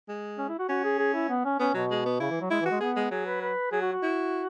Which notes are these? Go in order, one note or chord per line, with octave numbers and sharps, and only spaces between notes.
G#3
C#4
E4
F#4
C#4 F#4
G#4
G#4
E4
B3
C#4
B3 C#4
B2 F#3
G#3
B3
C#3 E4
E3
F#3
G#3 E4
E3
F#4
G#3
B3 G#4
G#3
F#3 G#4
B4
B4
F#3 G#4
F#4
F#4
E4